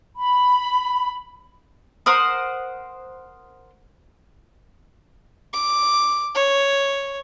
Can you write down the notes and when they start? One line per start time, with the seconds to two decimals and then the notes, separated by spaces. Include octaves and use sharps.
0.17 B5
2.06 A#4 C5 F#5 D#6
5.53 D6
6.35 C#5